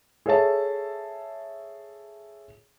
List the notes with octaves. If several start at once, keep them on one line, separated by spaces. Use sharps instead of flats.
G#4 A4 C#5 E5 A5